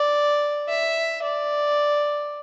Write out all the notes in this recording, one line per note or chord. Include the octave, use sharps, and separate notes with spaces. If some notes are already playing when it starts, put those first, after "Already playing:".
Already playing: D5
E5
D5